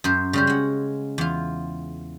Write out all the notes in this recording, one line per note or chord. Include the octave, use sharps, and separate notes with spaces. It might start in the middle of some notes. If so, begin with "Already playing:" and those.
F#2 C5
C#3 G3 C5
G#3 F#5
E2 F4